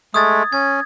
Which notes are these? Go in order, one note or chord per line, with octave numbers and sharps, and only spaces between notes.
G#3 A3 D#6 G#6 A6
C#4 G#6